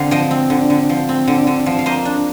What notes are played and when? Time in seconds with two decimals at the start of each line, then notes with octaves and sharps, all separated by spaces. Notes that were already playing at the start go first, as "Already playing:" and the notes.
Already playing: D3 C4 F5
0.11 F3 D#5 G5
0.31 C4
0.50 D3
0.70 D3
0.89 F3
1.09 C4
1.28 D3
1.47 D3
1.66 F3
1.79 F5
1.86 A#3 C5 D#5
2.05 D4